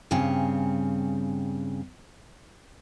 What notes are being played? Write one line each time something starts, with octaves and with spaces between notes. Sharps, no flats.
G2 C#3 C4 C#5 G#5